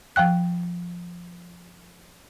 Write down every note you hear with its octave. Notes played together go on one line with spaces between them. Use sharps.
F3 F5 G5 F#6